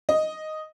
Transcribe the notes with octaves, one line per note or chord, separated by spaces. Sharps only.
D#5